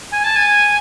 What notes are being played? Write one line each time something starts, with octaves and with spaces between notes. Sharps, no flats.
G#5
A5
G#5